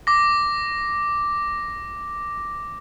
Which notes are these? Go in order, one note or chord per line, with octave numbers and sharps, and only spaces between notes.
D6 A#6